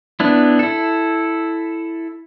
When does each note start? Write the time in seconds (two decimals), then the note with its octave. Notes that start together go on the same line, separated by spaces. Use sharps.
0.20 B3 D4 E4
0.59 E4 A4